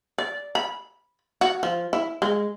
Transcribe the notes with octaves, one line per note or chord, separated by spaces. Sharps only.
D5
B5
F#4
F3
E4
G#3